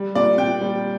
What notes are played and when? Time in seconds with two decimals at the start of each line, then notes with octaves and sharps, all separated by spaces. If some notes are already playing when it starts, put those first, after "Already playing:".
Already playing: G3
0.15 A#2 D5
0.38 A#2 G5
0.61 G3